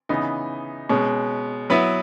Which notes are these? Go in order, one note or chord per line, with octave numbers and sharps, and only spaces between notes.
C#3 E3 B3 D#4
B2 G#3 C#4
F#3 B3 E4 B4